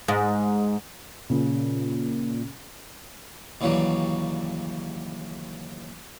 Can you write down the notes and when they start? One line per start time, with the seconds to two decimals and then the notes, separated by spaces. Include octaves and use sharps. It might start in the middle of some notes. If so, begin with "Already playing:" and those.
0.08 G#2
1.30 A#2 C#3
3.61 D#2 C#3 E3 F#3 G3